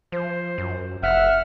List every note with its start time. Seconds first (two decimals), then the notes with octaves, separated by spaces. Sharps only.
0.12 F3 C5
0.58 F#2
1.03 F1 E5 F#5 F6